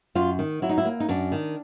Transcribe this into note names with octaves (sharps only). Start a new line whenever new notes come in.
F#2 F4
D#3
F#3 E4
D#4
E4
A#3
D#4
F#2 D4
D#3